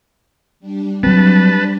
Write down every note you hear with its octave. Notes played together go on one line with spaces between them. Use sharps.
G3 D4
F#3 G3 C4 D4 B4 A5